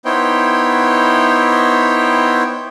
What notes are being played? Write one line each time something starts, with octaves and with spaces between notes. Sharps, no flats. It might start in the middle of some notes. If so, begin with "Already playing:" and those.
B3 D#4 E4 C5 C#5 G5